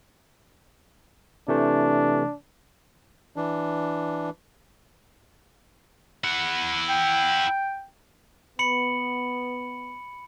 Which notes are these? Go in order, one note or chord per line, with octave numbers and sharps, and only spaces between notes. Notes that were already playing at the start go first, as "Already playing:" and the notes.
C3 E3 A3 D4
E3 D4
E4 F#5
G5
B3 B5 C#7 F#7